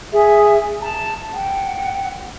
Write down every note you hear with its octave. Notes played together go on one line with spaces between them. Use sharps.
G#4 E5
A5 A#5
F#5 G5